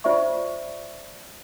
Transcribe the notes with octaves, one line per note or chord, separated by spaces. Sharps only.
F4 C5 D5 E5 C#6